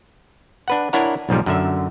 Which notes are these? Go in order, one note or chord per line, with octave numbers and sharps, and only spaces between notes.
D4 B4 F#5
D4 E4 A#4 C#5 F#5 A#5
B1 G#2 F3 G3
F#2 D3 E5